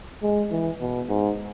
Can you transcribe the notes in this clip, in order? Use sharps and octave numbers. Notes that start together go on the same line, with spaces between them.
G#3
E3
B2
G#2